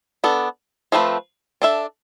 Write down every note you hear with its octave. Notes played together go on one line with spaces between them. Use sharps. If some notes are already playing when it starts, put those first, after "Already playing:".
B3 D4 A4
F3 A3 C4 E4 B4
D4 A4 E5